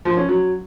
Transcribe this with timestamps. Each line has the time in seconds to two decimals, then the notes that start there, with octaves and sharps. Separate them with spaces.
0.05 F3
0.17 C#4
0.29 F#3